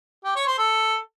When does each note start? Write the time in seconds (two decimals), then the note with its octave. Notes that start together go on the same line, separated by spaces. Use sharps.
0.24 G4
0.36 C#5
0.47 C5
0.58 A4